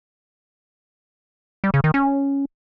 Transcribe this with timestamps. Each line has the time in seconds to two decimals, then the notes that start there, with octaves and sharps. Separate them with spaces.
1.64 G3
1.74 C#3
1.84 D#3
1.94 C#4